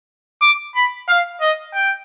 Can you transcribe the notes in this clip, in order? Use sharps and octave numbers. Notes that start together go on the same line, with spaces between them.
D6
B5
F5
D#5
G5